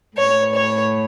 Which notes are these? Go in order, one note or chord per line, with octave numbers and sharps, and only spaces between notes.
A2 C#5
C#5